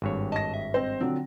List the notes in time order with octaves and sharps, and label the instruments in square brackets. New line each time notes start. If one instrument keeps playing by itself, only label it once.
[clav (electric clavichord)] G#1 G2 C#5
[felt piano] D#5 A#6 [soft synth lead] A5
[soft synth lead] E5
[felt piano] C4 C5 [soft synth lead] D#5
[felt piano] D3 F3 F#3 [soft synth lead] C4